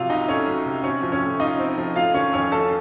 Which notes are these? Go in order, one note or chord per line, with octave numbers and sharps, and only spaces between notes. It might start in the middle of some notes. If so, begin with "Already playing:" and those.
Already playing: C3 F#3 F4 F5
C2 D#4 D#5
A3 C#4 C#5
F#3
C3
C4 C#4 C#5
F3
C#4 C#5
A2
D#4 F4 D#5
C4
F3
A3 F4 F5
D#3 C#4 C#5
F2 C#4 C#5
C#4 A4 A5